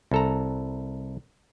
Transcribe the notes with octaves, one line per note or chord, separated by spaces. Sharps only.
C2 A4 A#5